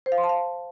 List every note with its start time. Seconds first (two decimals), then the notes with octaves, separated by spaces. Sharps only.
0.06 C5
0.12 F5
0.18 C6
0.24 A5
0.29 F5